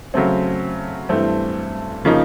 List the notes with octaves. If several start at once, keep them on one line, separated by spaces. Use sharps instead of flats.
C#3 F#3 A3 C4
G2 E3 A3 C4
C#3 F3 A#3 D#4